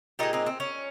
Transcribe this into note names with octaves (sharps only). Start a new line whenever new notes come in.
A#2 G#3 D#4 G4
C4 D#4
C4
C#4